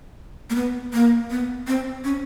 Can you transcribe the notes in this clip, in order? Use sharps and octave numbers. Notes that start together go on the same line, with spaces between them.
A#3
B3
A#3
B3
C4
C#4